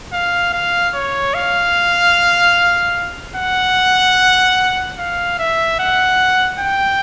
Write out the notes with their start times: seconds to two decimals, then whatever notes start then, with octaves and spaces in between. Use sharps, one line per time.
0.13 F5
0.53 F5
0.95 C#5
1.34 F5
3.36 F#5
4.98 F5
5.39 E5
5.80 F#5
6.60 G5